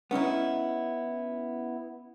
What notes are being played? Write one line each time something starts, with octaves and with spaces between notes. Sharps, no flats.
B3 C#4 D#4 E4